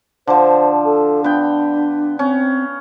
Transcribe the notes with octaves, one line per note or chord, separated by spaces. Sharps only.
D3 F3 C5
A4
B3 D4 G5
C4 C#4